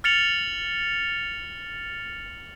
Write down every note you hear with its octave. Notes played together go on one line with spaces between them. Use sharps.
F6 A6 C#7 F7 F#7